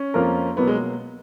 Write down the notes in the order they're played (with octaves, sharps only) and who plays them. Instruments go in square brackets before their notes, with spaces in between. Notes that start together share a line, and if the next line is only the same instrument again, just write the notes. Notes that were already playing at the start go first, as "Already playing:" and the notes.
Already playing: [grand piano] C#4
[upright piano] F2 F3 A#3 F4 A#4
[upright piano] B2 F#3 A#3 [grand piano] B3
[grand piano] G#3